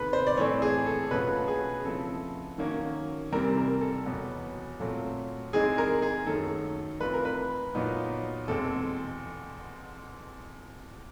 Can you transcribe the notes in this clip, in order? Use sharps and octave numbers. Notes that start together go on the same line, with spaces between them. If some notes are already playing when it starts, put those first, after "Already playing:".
Already playing: C3 D#3 G#3 B3 A4 B4
C5
D5
A2 E3 A3 C4 C#5
G#4
A4
B2 F#3 A3 C#4 F4 B4
G#4
C#3 F3 A3 C4 E4 A4
D#3 F#3 A#3 C#4
C3 E3 G3 C4 A#4
A#4
A4
E2 B2 F#3 B3
A#2 F#3 A3 C4
E3 G#3 C4 D#4 G#4
A#4
G#4
F#2 D#3 F#3 A3 A4
E3 A3 C4 F4 B4
A#4
B4
A#2 F#3 B3 D#4
E2 B2 G#3 C4 A4